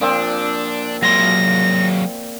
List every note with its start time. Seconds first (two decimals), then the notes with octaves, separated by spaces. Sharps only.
0.01 A#2 F3 C4 D4
1.02 F#3 G#3 A#3 C6 A#6